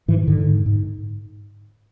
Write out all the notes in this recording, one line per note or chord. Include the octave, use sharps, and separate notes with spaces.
G#2 E3
G#2 D3
G#2
G#2